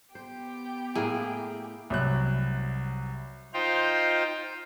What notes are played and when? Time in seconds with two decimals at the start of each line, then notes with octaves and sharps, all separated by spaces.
0.15 B3 G4 C5 G5
0.95 A2 A#3 E4 G#4
1.90 C2 F#3 F#6
3.54 D#4 F4 C5 F5 G5